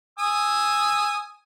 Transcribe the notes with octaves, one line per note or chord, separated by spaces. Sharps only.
G#5 D#6 E6